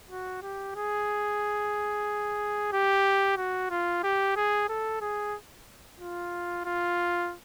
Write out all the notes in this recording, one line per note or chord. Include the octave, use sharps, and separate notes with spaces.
F#4
G4
G#4
G4
F#4
F4
G4
G#4
A4
G#4
F4
F4